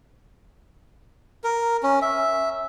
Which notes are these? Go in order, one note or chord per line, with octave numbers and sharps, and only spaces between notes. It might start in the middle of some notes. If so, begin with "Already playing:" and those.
A#4
C#4
E5